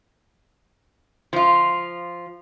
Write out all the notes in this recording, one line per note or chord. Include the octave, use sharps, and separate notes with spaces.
F3 F4